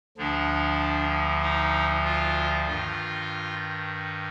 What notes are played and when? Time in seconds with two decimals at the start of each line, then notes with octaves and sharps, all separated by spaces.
0.18 D2 D3 F3 D4
1.42 D#4
2.04 F4
2.67 G2 D#3 F4